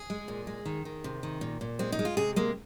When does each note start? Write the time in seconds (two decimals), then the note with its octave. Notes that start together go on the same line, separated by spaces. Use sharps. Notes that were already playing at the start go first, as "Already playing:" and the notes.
Already playing: G#4
0.10 G#3
0.28 A#2
0.47 G#3
0.66 D#3
0.85 D#3
1.04 C3
1.23 D#3
1.41 A#2
1.61 A#2
1.79 G#3 C4
1.92 D#4
1.99 G#3
2.05 F4
2.17 C3 G#4
2.36 G#3 A#3